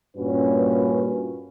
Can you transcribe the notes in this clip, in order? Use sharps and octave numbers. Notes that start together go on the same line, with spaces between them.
G2 A#2 C#4 F#4 B4